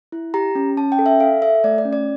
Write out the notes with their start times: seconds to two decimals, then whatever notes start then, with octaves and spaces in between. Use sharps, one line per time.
0.12 E4
0.34 G4 A#5
0.55 C#4
0.77 C#4 A5
0.92 G5
0.99 A4
1.06 E5
1.20 A4 F5
1.42 A4 E5
1.64 A3 D5
1.78 D5
1.85 C#4
1.93 D5